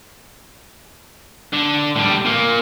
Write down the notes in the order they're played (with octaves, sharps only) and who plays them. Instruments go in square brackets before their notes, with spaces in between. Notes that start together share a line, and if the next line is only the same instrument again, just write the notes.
[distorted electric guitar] D3
A2 G3
A#2 A#3